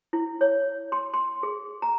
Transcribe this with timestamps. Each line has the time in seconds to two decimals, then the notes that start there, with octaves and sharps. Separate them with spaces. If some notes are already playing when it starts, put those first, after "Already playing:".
0.13 E4
0.41 C#5
0.92 C6
1.14 C6
1.43 G#4
1.82 A#5